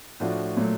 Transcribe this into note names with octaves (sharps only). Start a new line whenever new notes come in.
A2 F3 A3 D4 F#4
A#2 F#3 A3